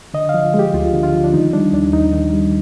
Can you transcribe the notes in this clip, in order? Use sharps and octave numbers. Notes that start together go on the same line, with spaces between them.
D3 D#5
F5
F3
G#3
G4
D2 F4
D3
F4
F3
D4
D#3 D#4
G3 D4
D#2 D4
D#2 D#4
D#3
G3